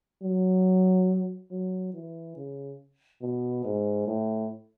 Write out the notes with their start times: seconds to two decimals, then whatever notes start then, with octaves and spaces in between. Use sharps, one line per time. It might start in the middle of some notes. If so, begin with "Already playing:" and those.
0.23 F#3
1.51 F#3
1.94 E3
2.37 C#3
3.22 B2
3.65 G#2
4.08 A2